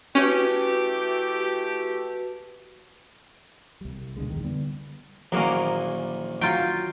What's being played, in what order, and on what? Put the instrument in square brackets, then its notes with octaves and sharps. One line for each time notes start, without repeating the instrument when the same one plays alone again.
[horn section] E3 A3 G4 [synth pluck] C#4 [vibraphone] F#4 B4
[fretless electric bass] C2 G3
C#2 B2 D3 G#3
F2 D#3
D3 G3 B3
[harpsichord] A#1 [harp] D#3 E3 D6 [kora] F#3 A#3 C#4
[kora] F#3 [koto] F4 G5